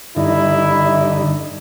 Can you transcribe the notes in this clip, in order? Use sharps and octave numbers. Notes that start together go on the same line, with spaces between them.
G2 D3 D#4 E4